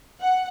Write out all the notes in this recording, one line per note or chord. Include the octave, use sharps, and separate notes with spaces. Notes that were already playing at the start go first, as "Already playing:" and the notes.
F#5